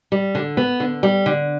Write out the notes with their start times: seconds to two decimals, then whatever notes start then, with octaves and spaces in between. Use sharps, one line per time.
0.12 G3
0.35 D3
0.57 B3
0.80 D3
1.03 G3
1.26 D3